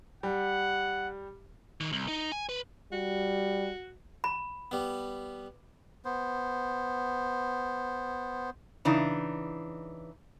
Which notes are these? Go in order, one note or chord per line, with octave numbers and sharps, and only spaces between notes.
G3 F#5
D#3
C2
D#4
G#5
B4
G3 F#4
B5
G3 B3
B3 C5
C#3 E3 D4 D#4